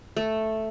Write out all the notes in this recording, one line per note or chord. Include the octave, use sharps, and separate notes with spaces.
A3